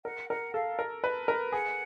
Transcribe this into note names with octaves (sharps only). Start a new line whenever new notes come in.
A#4 F#5
A#4 F#5
A4 F5
A#4
B4
A#4
G#4 F#5